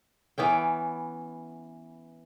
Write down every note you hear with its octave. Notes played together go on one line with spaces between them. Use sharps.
E3 B3 C#4 G5